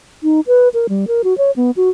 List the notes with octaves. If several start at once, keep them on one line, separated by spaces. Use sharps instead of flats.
D#4
B4
A#4
G3
A#4
F#4
C#5
B3
F#4